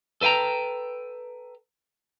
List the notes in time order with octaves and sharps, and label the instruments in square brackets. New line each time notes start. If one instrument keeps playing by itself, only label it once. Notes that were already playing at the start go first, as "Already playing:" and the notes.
[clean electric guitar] A4 B4 E5 G5 A#5